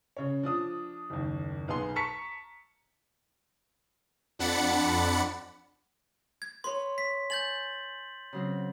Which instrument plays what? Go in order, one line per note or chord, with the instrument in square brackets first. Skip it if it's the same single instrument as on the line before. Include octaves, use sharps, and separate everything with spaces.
[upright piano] C#3 C#5
F3 D4 D#6
F#1 D#2
B1 B3 G#4 C6
A5 A#5 C#6 B6 C#7
[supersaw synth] F2 D4 F#5 B5 A6 C#7
[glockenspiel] G#6
[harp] B4 C#5 [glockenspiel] C6
[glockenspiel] B6
[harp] G#5 [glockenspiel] G6 A6 F#7
[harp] C#3 F#3 C4